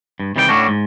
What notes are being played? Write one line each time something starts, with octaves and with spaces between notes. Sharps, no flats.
G2
C3 D#3 E3 G3 C5 G5
A2 A3 C#4 D4 F#4
G#2